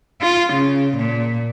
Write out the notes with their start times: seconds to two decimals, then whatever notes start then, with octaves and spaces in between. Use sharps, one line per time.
0.22 F4
0.54 C#3
0.97 A#2